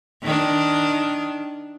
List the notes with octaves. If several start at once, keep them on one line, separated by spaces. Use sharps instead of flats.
D#3 D4